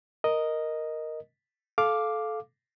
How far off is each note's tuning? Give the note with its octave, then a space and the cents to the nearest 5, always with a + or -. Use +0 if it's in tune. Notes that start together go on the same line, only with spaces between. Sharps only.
A#4 +0 D#5 +0
A4 -20 F5 +0 D6 +0